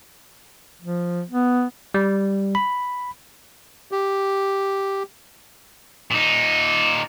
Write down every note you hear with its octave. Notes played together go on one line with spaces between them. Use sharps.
F3
B3
G3
B5
G4
A#2 D#4